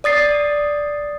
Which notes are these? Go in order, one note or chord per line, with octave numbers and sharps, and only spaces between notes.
D5 D#6 A6 C7